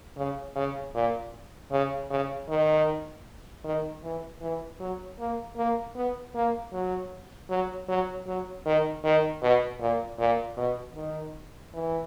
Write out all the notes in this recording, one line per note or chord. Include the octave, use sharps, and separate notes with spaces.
C#3
C#3
A#2
C#3
C#3
D#3
D#3
E3
E3
F#3
A#3
A#3
B3
A#3
F#3
F#3
F#3
F#3
D#3
D#3
B2
A#2
A#2
B2
D#3
E3